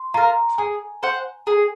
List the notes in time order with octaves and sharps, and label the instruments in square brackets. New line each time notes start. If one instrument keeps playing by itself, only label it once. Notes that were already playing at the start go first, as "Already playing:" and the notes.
Already playing: [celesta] C6
[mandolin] F4 A#4 [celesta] A#5
[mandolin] G#4 [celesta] G#5
[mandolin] C5 F#5
G#4